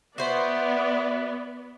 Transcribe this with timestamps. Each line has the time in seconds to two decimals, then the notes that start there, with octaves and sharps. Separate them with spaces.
0.18 B3 F#4 C5 D5 E5